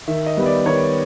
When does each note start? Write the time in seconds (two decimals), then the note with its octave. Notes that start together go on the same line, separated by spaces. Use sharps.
0.07 D#3 E5
0.26 D#5
0.37 G3 B3
0.46 D5
0.65 D#3 C#5